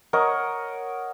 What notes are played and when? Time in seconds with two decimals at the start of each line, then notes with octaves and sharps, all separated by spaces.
0.13 A#4 C#5 D#5 F#5